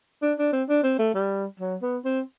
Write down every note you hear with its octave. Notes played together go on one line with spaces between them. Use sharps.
D4
D4
C4
D4
C4
A3
G3
F#3
B3
C4